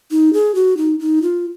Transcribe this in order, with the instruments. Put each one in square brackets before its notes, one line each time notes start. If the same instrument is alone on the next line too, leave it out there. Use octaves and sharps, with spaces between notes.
[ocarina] D#4
G#4
F#4
D#4
D#4
F4